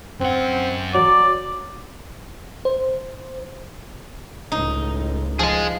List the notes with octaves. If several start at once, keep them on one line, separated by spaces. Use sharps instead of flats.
F#2 C4 F#5
F#3 D5
C5
C#2 A2 D#4
F3 G#4 D#5